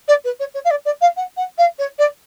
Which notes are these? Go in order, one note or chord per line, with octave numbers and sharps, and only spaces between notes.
D5
B4
C#5
C#5
F5
D5
D5
F5
F#5
F#5
F5
C#5
D5